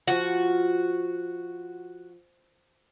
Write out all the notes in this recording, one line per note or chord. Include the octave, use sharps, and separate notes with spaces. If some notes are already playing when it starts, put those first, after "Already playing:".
F3 F4 F#4